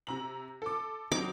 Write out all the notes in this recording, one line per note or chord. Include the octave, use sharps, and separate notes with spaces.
C3 A#5 F#7
A4 D6
F#3 C4 D#4 D6